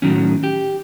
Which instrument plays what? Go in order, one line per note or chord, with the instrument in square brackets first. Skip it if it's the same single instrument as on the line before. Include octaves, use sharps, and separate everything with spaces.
[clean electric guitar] A2 D#3 F#3 C#4
G4